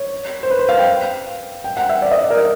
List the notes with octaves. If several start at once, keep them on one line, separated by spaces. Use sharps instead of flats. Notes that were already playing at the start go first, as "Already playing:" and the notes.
Already playing: C#5
C5
B4
C5
F5
G5
G5
F#5
E5
D5
D#5
D5
A#4